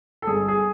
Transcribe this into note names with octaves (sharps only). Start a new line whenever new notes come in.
A4
G1 G#4
G#4